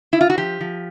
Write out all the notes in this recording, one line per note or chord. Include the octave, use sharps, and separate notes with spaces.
E4
F4
F#4
F3 G4
F3